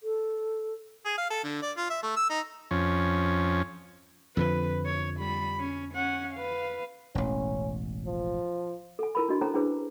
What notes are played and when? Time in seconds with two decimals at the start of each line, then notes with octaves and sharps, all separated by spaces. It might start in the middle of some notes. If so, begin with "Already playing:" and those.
0.03 A4
1.05 G#4
1.18 F5
1.30 A4
1.44 D3
1.62 D5
1.77 F4
1.90 E5
2.03 A3
2.16 E6
2.30 D#4
2.71 F2 C#4
4.37 F2 D3 F3 B4
4.86 C#5
5.19 G3 B5
5.60 C#4
5.94 C#4 F#5
6.34 B4 F5
7.15 E1 A1 C#4
8.06 F3
8.99 A4 G#5
9.15 E4 A#4 B5
9.29 D4 F#4 D#5
9.41 C#4 E4 A4 C5 A5 A#5
9.54 C#4 D4 E4 G#4 B4 C5